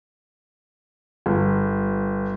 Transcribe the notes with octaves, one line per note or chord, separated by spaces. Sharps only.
G1